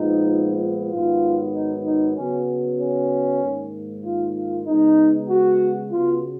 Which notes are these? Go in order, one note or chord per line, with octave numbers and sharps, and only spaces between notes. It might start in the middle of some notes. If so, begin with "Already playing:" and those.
Already playing: A#2 F3 G#3 B3 D#4
G#2 D#3 F#3 B3 F4
D#4
D#4
C#3 F#3 B3 C#4
C#4
G#2 D#3 A#3
F4
F4
C#3 G#3 B3 D#4
F#4
C#3 F#3 B3 F4